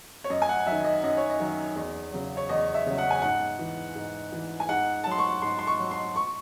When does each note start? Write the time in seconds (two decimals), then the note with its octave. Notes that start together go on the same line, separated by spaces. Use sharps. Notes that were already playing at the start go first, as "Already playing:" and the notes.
0.24 C#5
0.30 F#2 D#5
0.42 G#5
0.49 F#5
0.67 D#3 F#3 E5
0.84 D#5
1.03 F#2 D#5
1.17 C#5
1.30 D#5
1.40 D#3 F#3
1.76 E2
2.13 C#3 F#3
2.37 C#5
2.49 E2 D#5
2.75 E5
2.86 C#3 F#3
2.98 F#5
3.11 G#5
3.22 G#2 F#5
3.59 E3
3.96 G#2
4.32 E3
4.60 G#5
4.69 G#2 F#5
5.04 A5
5.06 F#3 C6
5.18 C#6
5.42 G#2 C6
5.59 C6
5.67 C#6
5.79 F#3
5.91 C6
6.16 C#6